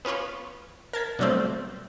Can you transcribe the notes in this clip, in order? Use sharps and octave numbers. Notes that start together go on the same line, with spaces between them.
B3 C#4 F4 B4 C#5
A#4 A5 G#6 B6
B2 D3 F#3 G3 A3 C4